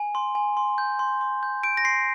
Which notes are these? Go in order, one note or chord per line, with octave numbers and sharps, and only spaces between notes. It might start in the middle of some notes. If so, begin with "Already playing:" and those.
Already playing: G#5
C6
G#5
C6
G6
C6
C6
G6
G6 D7
A#6
C6 C7